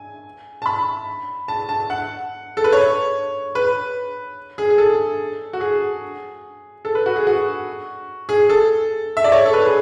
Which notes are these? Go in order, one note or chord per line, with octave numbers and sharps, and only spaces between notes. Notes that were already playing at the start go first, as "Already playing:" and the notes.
Already playing: G#5
A5
B5
A5
A5
F#5
A4
B4
C#5
B4
G#4
G#4
A4
F#4
G#4
A4
B4
F#4
G#4
F#4
G#4
A4
E5
D5
C#5
A4
B4
G#4